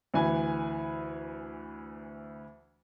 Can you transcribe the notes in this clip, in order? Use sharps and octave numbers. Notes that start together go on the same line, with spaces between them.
D2 E3 B4 G#5